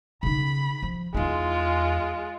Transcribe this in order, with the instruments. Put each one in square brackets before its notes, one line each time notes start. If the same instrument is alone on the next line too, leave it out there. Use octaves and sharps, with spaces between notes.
[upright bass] C#3 D#4 [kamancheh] B5
[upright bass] F3
[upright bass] E2 D#4 [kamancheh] G#3 F4